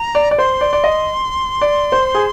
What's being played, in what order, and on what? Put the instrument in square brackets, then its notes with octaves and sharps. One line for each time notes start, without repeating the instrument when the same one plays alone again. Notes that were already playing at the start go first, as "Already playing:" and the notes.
Already playing: [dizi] A#5
[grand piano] D5
D5
[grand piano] C5 [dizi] C6
[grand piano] D5
D5
D#5
D5
C5
G#4